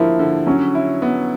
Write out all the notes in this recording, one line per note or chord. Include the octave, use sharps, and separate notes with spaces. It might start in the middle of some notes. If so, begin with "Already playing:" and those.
Already playing: D3 F3 A#3 E4 A#4
D3
F#3 C#4
E4
B3